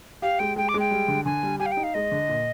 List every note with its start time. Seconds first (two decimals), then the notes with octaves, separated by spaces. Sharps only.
0.22 G4 F5
0.39 G#3 G5
0.56 G#3 G5
0.69 D6
0.74 G#3
0.79 G5
0.91 G3
1.08 D3
1.25 D3 G#5
1.43 G3
1.59 G4 G#5
1.66 F5
1.72 G5
1.77 D#4
1.83 F5
1.94 G#3 D#5
2.12 D3
2.28 A#2